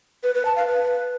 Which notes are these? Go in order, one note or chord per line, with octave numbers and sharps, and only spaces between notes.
B4
B4
A5
F5
B4